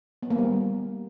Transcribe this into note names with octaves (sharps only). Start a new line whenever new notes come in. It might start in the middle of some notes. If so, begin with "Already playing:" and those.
B3
A#3
G3